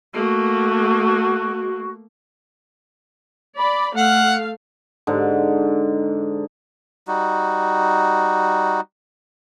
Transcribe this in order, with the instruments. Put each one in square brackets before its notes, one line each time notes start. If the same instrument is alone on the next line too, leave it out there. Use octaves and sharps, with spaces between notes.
[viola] A3 A#3 [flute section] F#4
[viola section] D5 B5
[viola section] A3 F5 [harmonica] F#5
[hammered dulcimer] G#2 D3
[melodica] G3 D#4 F#4